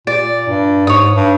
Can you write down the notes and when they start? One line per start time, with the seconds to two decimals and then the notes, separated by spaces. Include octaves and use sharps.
0.07 A#2 D5
0.49 G2
0.87 G#2 C#5 D#6
1.16 G2